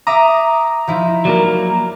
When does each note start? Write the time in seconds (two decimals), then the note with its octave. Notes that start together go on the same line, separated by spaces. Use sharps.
0.07 E5 A#5 D6 D#6
0.87 F3 D#4 E4
1.25 F#3 A#3 A#4 D5